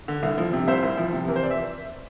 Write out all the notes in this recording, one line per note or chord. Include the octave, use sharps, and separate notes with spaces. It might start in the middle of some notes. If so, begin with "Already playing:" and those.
D3
C2
F3
C3
C2 C5 E5
C2
F3
C3
E3 A#4
C5
D5
E5